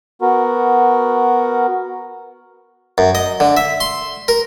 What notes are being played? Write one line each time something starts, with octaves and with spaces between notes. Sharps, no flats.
B3 F#4 A#4
F#2
D#5
D3
E5
C6
A#4